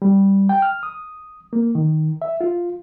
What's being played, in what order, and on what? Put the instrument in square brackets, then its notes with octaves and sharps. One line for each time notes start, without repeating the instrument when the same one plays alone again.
[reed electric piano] G3
G5
F6
D#6
A#3
D#3
E5
F4